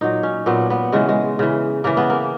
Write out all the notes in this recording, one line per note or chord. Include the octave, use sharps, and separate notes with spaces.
A#2 F#3 D#4
C#4
A#2 F#3 B3
B3
C#3 E3 G#3
G#3
C#3 E3
C#3 E3 A#3
B3
A#3